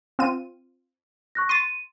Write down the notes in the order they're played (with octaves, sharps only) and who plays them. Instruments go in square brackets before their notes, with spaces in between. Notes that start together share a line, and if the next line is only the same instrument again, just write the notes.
[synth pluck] C4 F4 D#7
[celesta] C#6 F#6 A#6
[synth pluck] C6 A6 [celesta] D#7